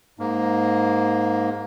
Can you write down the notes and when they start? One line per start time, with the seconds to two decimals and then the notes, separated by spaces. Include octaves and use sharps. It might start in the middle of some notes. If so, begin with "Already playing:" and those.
0.19 G#2 A#3